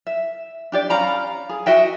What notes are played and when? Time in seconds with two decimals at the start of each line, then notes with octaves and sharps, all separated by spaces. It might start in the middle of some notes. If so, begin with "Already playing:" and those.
0.07 E5
0.72 D4 G4 D5
0.90 C#4 F5 A#5 B5
1.49 G#4
1.66 F#4 D#5 E5 G5